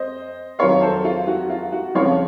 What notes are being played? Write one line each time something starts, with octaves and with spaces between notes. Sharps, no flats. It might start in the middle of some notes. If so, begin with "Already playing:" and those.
Already playing: F2 C5 D#5
F2 D#3 F#3 C#5 F5
A4 C5
F4
F#4
F4
F#4
F2 C#3 F3 C4 C#5 F5